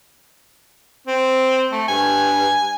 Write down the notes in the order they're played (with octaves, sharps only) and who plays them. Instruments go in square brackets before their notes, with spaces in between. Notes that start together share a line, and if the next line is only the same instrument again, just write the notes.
[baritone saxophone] C4
A3
[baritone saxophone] G2 [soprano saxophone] G#5